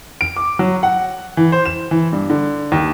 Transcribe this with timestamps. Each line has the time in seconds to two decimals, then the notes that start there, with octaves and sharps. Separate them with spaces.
0.21 D7
0.36 D6
0.59 F#3
0.83 F#5
1.37 E3
1.52 C5
1.66 E7
1.91 E3
2.12 G2
2.30 D3
2.72 D#2